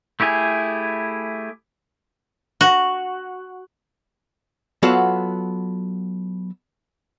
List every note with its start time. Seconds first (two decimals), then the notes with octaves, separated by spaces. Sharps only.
0.20 A3 E4 G4 G#4 G#5
2.61 F#4
4.83 F#3 B3 F4 F#4 A4